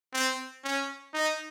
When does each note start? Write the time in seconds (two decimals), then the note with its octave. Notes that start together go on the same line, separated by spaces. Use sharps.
0.13 C4
0.64 C#4
1.14 D#4